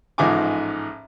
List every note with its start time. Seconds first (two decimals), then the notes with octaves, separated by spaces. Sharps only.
0.18 A1 G#2 F3 D#4 G#5 D6